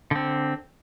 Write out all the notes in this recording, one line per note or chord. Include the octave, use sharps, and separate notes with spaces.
D3 C4